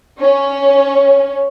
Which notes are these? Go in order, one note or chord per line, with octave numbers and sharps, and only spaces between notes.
C#4